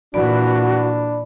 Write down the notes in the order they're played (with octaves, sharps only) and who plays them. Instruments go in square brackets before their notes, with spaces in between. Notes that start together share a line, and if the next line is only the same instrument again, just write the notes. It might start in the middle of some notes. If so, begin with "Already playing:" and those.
[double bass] A#2 E3 [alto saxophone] D4 [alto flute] F#4 [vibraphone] D5 B5